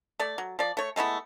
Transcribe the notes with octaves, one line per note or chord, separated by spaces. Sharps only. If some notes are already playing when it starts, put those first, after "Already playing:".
A3 D5
F#3
F3 D5
A3 C#5
G#3 A3 B3 E4